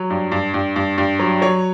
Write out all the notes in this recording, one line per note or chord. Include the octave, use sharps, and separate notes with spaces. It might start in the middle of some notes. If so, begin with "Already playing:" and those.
Already playing: F#3
G2
G2
G2
G2
G2
F#3
F#3 C#5